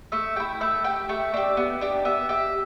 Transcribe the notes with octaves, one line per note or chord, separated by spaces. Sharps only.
A3 E5
E4 G4 G5
A3 E5
G4 G5
A3 E5
D4 G4
B3
D4 G4
B3 E5
G4 E5